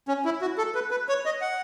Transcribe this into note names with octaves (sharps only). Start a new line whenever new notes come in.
C#4
E4
F#4
A4
B4
B4
C#5
D#5
F#5